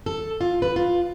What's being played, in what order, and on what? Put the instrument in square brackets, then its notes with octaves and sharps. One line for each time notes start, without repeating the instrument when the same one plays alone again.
[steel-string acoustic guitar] A4
F4
B4
F4